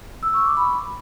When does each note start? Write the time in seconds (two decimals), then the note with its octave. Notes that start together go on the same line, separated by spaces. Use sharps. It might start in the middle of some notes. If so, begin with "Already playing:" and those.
0.23 E6
0.34 C#6
0.45 D6
0.57 B5